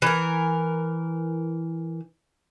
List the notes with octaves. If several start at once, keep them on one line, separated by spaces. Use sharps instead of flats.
E3 A#4